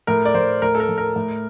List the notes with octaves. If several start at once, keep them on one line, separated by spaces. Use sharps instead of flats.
A2 A#4
D5
A2 C5
A2 A#4
A4
A#4
A2
A#4
A2